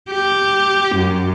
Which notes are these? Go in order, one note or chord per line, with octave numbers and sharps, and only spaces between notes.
G4
F#2